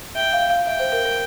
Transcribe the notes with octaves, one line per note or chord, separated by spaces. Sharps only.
E5 G5
F5
F5
E5 G5
C5
A#4
A#4